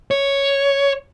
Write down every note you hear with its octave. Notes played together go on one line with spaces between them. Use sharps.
C#5